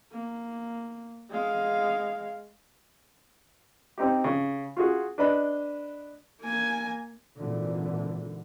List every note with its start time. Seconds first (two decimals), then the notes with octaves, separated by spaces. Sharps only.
0.12 A#3
1.30 G#3 F5
3.98 C4 D#4 G4
4.24 C#3
4.77 F4 F#4 G#4
5.18 D4 B4 D#5 B5
6.42 A#3 G#5
7.38 G#1 A#2 D3 E3